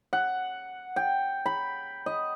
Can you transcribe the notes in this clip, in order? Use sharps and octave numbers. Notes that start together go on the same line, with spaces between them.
F#5
G5
B5
D#5